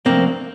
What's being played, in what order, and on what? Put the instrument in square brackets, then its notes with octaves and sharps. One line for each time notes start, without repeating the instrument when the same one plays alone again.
[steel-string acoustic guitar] C3 F3 A3 D4 [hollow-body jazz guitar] A#3 C4